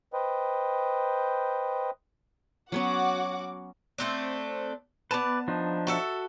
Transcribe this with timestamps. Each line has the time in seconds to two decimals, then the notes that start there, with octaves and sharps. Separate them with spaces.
0.13 B4 C5 D#5 G5
2.72 F#3 B3 C#4 F#4 F#5 D6
3.98 A3 C4 D4
5.11 B3 B4 D5 A5
5.48 F3 D4 D#4
5.87 F#4 A4 E5